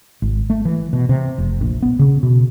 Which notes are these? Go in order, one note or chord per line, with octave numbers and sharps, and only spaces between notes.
G#1
A3
E3
B2
C3
F1
A#1
B3
C#3
B2